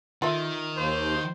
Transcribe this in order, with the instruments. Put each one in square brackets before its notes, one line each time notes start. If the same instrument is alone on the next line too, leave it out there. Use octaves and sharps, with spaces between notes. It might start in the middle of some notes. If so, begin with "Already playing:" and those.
[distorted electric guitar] D#3 [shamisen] F4 A4 E5
[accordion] D#2 [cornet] C5